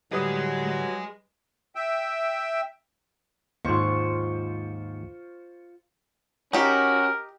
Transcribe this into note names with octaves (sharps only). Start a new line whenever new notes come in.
A2 D3 F#3 G3 G#4 B4 D#5 D#6
E5 G5
D#2 G#2 F4 C5 C#6
C#4 D#4 F#4 G4 A#4